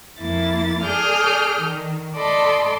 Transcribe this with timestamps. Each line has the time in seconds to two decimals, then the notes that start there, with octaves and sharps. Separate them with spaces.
0.18 F2 A#3 E4 A6
0.84 G#4 A4 D5 D#6 F6 G6
1.60 D#3
2.15 A4 D5 D#5 A5 B5 C6